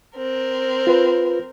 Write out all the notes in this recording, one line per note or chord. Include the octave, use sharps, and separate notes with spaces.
C4 A#4
F4 B4